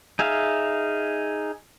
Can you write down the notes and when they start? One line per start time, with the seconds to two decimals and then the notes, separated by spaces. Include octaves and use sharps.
0.19 D#4 G#4 E5 F5